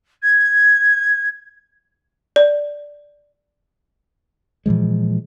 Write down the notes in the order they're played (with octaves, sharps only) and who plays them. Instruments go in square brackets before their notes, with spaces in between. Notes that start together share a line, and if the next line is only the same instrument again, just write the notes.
[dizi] G#6
[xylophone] D5
[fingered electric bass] A#2 E3 F3 G#3